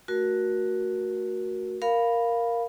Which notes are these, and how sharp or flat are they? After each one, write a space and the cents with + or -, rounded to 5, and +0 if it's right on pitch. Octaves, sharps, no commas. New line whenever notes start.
A3 +10 F#4 +0 A#4 +20
A#4 +0 F5 +0 B5 -5